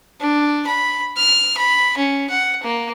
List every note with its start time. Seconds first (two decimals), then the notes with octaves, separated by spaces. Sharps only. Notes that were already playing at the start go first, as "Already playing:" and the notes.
0.21 D4
0.67 B5
1.17 F6
1.57 B5
1.97 C#4
2.30 F#5
2.63 A#3